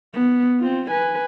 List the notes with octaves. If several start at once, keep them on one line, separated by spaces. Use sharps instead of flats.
B3
C4 F4
B4 G#5